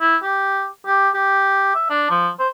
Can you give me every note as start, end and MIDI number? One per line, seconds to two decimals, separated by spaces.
0.01 0.16 64
0.22 0.67 67
0.86 1.09 67
1.14 1.75 67
1.75 1.89 76
1.90 2.07 62
2.10 2.29 53
2.39 2.48 72